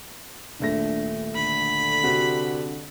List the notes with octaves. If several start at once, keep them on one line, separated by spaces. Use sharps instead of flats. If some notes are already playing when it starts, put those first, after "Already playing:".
D#1 A3 D4 A#6
D3 B5
C3 F#4